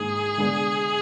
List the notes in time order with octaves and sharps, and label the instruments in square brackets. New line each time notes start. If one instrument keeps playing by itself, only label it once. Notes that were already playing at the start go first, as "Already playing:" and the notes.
Already playing: [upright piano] G#2 D#3 A#3 D#4 [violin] G#4
[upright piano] D3 G#3 B3 D4